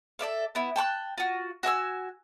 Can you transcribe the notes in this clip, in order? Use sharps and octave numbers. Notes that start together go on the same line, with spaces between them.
A4 D5 E5 F5
B3 E4
G5 A5 C6 F#6
F4 F#4
F#4 E5 G#5 E6